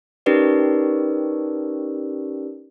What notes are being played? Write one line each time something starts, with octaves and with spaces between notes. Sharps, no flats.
C#4 D#4 G4 A#4 B4 D5